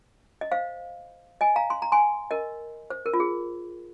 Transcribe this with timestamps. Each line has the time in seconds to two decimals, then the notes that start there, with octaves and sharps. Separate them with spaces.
0.41 D#5
0.52 C5 F5
1.41 D#5 G#5
1.56 F5 A#5
1.70 C6
1.82 A#5
1.92 G#5 C6
2.31 A#4 D#5
2.90 C5
3.06 A#4
3.14 F4
3.20 G#4